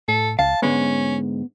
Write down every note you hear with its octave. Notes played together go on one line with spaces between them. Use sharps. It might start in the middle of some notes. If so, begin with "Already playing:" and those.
A2 A4
C#2 F5 A5
G#2 D3 G#3 B3 C#4